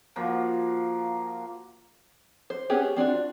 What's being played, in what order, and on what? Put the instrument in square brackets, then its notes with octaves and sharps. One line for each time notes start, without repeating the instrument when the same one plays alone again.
[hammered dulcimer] F3 A#3 F#4
[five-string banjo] C5
B3 C#4 G4 G#4
C4 D4 F4 F#4